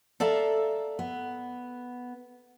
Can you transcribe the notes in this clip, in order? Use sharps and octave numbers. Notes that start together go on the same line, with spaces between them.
A4 D5 E5 F5 A#5
B3